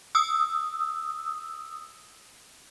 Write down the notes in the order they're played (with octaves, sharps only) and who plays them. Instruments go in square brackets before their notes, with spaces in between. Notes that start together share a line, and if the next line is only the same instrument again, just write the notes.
[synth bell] D#6 E6